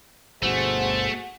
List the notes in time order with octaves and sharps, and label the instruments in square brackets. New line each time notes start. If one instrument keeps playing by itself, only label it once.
[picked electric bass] G1 G2 B2 [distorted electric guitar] A3 [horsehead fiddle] F#4 G#4 [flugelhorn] C5